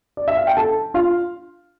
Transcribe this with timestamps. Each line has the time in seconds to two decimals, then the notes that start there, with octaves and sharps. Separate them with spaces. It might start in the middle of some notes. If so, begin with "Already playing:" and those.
0.17 D5
0.28 E5
0.37 F5
0.47 G5
0.57 A4 A5
0.94 F4 F5